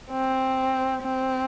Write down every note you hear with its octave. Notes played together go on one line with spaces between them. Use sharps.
C4
C4